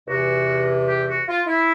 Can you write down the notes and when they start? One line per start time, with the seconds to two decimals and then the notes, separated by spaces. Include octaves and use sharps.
0.07 E2 C3 E3 F#4
0.87 G4
1.08 F#4
1.28 F4
1.47 E4